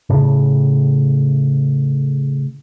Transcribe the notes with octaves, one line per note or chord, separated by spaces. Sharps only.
A2 C#3